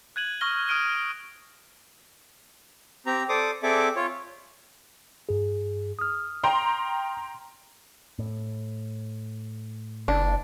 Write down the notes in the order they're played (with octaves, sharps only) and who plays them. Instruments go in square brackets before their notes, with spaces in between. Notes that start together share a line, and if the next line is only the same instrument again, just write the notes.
[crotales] F#6 G#6 D#7 F#7
C#6 D#6 F6 A#6 G7
D#6 F6 D7 D#7 G7
[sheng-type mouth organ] C4 G4 A#5
A4 C5 D5 D6 D#6
C4 G#4 A4 D5 E5 D6
F4 C#5
[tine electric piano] G2 G#4
D#6 F6
[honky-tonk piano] G5 A#5 C6
[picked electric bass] A2
[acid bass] F#1 [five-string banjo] D4